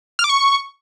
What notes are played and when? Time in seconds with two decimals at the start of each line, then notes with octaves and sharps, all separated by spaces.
0.19 F6
0.24 D6
0.29 C#6